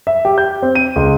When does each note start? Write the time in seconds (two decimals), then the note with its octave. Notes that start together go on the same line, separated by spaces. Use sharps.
0.07 E5
0.25 G4
0.38 G6
0.62 C4
0.75 D#7
0.96 C#2